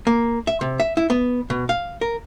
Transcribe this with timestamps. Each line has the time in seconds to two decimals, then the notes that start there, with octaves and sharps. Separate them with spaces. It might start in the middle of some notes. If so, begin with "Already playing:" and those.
0.07 A#3
0.47 E5
0.61 C3
0.80 E5
0.97 E4
1.10 B3
1.50 B2
1.69 F5
2.01 A#4